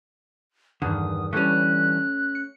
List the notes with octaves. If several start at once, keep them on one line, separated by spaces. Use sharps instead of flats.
E2 G2 D3 D#3 D#6
D3 E3 G3 A3 C#4 F#6
C#7